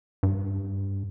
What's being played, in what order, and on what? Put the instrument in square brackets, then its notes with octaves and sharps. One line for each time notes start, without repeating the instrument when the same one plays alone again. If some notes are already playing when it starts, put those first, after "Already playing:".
[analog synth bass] G2